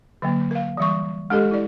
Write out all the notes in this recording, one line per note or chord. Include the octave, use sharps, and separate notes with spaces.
D3 F#3 A#3
A#4 F5
E3 G3 C#6
G#3 D4 G4 A4 D#5
E4 D5